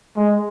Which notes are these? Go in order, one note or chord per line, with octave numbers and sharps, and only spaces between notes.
G#3